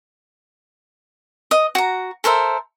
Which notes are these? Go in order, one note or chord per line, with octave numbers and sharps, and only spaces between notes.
D#5
F#4 A#5
A4 A#4 C5 E5